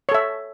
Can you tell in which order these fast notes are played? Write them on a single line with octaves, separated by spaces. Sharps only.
C#5 A4 E5